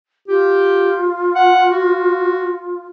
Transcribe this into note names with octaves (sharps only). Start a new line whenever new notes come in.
F4 G4
F#5
F#4